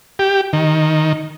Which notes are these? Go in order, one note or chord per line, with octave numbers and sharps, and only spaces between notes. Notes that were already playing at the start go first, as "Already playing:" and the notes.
G4
D#3